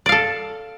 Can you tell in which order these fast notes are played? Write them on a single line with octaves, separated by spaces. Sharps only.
D5 F5 A4